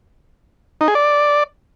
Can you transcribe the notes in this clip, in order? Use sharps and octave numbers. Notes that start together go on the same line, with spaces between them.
D#4
G#4
D5